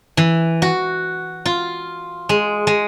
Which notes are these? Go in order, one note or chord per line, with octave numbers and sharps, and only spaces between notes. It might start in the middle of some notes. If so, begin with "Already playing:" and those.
E3
F#4
F4
G#3
G#3